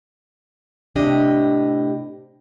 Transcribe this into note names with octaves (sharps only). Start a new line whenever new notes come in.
A2 C3 D4 G4 D#5